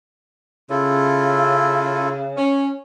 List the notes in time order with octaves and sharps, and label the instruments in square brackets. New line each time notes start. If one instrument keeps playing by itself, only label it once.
[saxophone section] C#3 [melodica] E4 F4 A4
[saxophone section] C#4